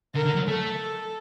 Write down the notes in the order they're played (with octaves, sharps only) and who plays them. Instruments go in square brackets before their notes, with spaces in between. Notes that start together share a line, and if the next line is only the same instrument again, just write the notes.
[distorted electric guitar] D3 [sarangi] A#4
[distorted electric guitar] D3
F#3
[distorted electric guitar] A3 [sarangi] A4